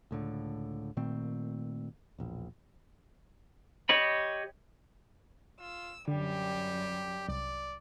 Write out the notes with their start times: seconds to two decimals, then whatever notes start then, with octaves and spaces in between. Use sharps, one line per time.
0.11 C#2 A2 D3
0.97 A#2 D#3 A3 C4
2.19 E1 A#1
3.89 G4 C#5 D#5 B5
5.60 F4 E6
6.08 F#2 D3 G3 G4
7.29 C2 D5